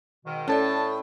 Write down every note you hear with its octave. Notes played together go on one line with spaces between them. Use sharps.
G#2 B2 D#3
A2 C#4 A4 D5 A5